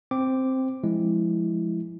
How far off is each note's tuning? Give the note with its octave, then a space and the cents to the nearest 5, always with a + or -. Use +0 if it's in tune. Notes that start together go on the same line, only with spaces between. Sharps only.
C4 +0 D6 +0
F3 +0 G#3 +5 E4 +0